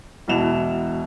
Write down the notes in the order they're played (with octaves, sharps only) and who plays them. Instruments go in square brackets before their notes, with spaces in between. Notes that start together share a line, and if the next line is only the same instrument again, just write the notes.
[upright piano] E1 B2 E3 E7 F7